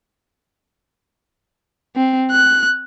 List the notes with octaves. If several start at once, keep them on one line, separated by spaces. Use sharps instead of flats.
C4
F#6